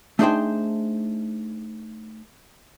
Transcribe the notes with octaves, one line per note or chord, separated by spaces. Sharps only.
A3 D4 D#4 G#4 C5 G5